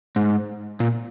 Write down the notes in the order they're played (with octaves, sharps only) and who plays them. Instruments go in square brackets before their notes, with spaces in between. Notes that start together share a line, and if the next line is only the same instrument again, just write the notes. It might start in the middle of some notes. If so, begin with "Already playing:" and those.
[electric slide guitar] G#2
A#2